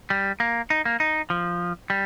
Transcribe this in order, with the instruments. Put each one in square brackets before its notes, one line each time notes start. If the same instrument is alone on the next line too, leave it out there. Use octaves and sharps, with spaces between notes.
[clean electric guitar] G3
A#3
D#4
A#3
D#4
F3
G3